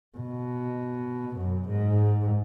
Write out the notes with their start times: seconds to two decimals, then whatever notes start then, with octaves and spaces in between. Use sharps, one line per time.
0.18 B2
1.37 F#2
1.69 G#2